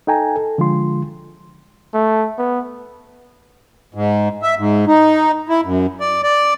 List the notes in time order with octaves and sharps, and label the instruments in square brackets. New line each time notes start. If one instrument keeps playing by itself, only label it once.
[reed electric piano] D#4 A4 G5 G#5 A#5
A4
D3 F3 G#3 F4 C6
[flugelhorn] A3
B3
[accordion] G#2
E5
G#2
D#4
E4
F#2
D5
D5